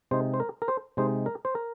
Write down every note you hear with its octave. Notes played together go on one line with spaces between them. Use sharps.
C3 G#3 D#4 C5
C5
A#4
A#4
C5
C3 G#3 D#4 C5
A#4
C5
A#4